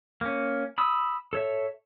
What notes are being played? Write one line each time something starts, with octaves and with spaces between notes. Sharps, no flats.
A#3 C#4
B5 D#6 E6
A4 C#5 E5